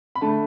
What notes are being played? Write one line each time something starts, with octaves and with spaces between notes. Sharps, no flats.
B5
D3 A3 A5